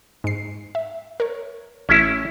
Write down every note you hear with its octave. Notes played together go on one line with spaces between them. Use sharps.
G#2 C7
E5
A#4 C#5
A1 A3 C#4 E4